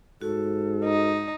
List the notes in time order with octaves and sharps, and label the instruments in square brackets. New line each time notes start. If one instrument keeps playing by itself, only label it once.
[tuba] G#2 [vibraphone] F#4 [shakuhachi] A4
[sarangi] D#4